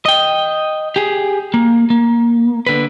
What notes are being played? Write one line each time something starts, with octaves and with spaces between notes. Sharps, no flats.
D#5 G5
G4 G#4
A#3
A#3
D3 B4